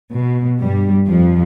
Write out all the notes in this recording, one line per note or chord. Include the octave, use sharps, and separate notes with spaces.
B2
G2 G3
F2 F3